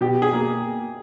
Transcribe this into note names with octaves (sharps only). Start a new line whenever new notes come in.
B2 G4
G#4
A#3